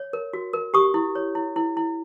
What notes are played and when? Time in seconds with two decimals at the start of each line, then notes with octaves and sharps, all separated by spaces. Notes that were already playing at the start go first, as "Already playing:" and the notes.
Already playing: C#5
0.13 A#4
0.33 F#4
0.53 A#4
0.74 G4 C#6 D#6
0.94 E4
1.15 C#5
1.35 E4
1.56 E4
1.77 E4